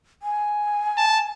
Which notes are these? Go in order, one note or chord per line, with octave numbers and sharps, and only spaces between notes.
G#5
A5